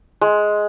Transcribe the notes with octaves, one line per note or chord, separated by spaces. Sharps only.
G#3